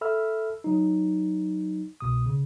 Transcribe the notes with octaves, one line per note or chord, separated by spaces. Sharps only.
A4 E5 B5 E6 F6
F#3 D#4
C2 B2 D#6
C#3